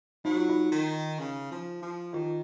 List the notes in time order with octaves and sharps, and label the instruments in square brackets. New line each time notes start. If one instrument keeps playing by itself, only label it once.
[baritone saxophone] F#3 [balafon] D#4
[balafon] F4
D#4
[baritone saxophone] D#3
C#3
F3
F3
[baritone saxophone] D#3 [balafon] F4